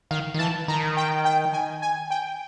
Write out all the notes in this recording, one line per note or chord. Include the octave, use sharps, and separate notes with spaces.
D#3 F5
D#3
E3 A5
D#3 A#5
G5
G5
G#5
G#5
G5